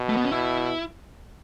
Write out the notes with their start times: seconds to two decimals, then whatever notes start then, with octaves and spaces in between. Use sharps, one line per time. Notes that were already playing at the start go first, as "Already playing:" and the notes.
Already playing: B2
0.09 A3
0.17 B3
0.24 C#4
0.31 B2 E4